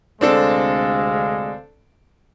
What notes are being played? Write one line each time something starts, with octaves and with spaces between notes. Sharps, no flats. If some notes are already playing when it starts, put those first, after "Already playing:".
D2 C3 G#3 C4 D4 A4 F5